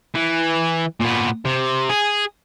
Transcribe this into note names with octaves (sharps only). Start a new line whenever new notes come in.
E3
A#2 B3
C3
G#4